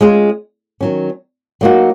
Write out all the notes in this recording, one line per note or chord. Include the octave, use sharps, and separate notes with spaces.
G#3 C#4 F4 G#4
D#3 F#3 C#4
F#3 A#3 D#4 F#4